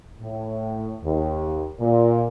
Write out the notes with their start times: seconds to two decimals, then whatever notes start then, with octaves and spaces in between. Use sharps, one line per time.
0.20 A2
1.03 D#2
1.79 A#2